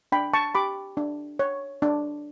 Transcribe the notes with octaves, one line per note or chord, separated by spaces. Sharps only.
D4 G5 B5
A5 C#6
G4 B5 D6
D4
C#5
D4